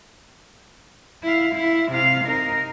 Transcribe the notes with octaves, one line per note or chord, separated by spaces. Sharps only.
E4 F5
E4
C3 F5
D#4 A#4